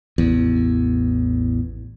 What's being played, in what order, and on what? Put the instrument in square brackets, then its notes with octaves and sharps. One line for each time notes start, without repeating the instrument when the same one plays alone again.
[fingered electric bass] A1 E2